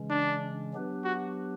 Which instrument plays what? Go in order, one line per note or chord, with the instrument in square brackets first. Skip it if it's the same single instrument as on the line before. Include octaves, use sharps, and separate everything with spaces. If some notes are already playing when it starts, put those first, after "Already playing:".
Already playing: [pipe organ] C#3 E3 G#3 C#4
[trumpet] D4
[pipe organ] F#3 B3 D4 G4 B4
[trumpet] F#4